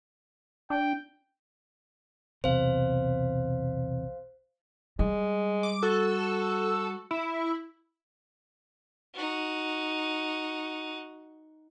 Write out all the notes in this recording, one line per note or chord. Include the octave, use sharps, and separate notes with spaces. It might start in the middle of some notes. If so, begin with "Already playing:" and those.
D4 G5
B1 E2 C3 C5 F5
G3 G#3
D6
F#4 A4
E4
D#4 F#4